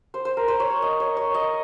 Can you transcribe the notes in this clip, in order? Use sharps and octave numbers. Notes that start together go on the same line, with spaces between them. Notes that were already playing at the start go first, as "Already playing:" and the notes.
C5
C5
A#4
C5
C#5
C#5
D#5
C#5
C#5
D#5